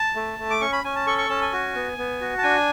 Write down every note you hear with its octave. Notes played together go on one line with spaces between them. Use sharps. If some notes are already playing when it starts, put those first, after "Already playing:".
Already playing: A5
A3
A3
D6
C#4 C#6
B5
C#4 G#5
A5
A4 C#6
C#6
C#4 A5
G#5
F#4
B3
B3
F#4
A5
D4 G#5